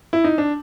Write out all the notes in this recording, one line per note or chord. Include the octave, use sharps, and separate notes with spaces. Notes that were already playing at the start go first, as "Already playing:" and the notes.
E4
D#4
D4